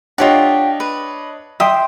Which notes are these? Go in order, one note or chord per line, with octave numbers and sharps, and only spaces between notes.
D4 F4 G4 C#5 D#5 F#5
B4
E5 G5 C6 D#6